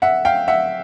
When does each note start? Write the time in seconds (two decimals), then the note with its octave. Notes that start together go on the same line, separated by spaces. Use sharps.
0.02 E5 F#5
0.25 F5 G5
0.48 E5 F#5